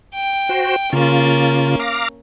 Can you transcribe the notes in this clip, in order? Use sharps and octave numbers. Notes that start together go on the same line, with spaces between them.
G5
F#4 C5
C#3 A#3 C#4 F4
F5 A#5 D6